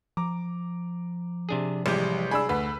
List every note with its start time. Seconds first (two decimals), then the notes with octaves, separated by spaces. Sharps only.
0.17 F3 A#5 D6
1.49 C3 D4 G#4
1.86 A1 C3 G3 G#3 G4
2.31 D4 G#4 B5 E6
2.49 D2 B4